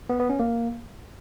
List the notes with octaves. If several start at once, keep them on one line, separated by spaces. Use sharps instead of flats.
B3
B3
C#4
A#3